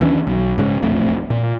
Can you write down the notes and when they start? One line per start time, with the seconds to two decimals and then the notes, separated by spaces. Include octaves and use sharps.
0.01 D#2 E3 C#4 D4
0.27 B1
0.58 G#2 C#3 G#3
0.82 E1 A#1 F2 A3
1.30 A#2